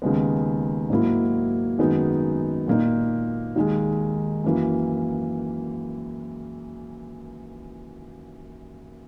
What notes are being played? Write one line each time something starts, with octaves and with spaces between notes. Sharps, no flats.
D#2 C#3 G#3 B3
G#2 F#3 A#3 E4
F#2 D#3 G#3 B3 D#4
A#2 A#3 D#4
D#2 D#3 G#3
F#2 E3 A#3